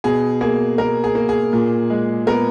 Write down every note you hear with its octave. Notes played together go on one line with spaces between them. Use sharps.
B2 G#4
A#3 G#4
B2 A#4
G#4
A#3
G#4
A#2
G#3
B3 A#4